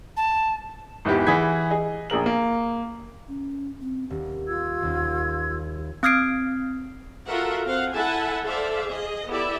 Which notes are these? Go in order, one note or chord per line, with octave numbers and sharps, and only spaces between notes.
A5
G#1 E2 E3 G4
E3 G#4 F#5 B5 G#6 B6
G#4 D#5
A#1 G#4 A#4 F#7
A#3
C#4
C4
D#1 G4
F4 E6 G#6
D#1 D#2
C4 D#6 F6 G#6 C7 D7
F4 F#4 A4 A#4 E5 F#5
C4 F5 F#5
E4 A4 E5 F#5 G#5 A5
A4 C5 D5 E5 F5
G#4 D#5
B3 E4 G4 A4 D5 E5